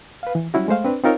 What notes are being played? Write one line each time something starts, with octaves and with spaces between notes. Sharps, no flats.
B4 F5
E3
F#3 G3 C#4 E4 F#4
G#3 A3 C5 F5
C4 D4 B4
C4 D#4 F4 A#4 C5 C#5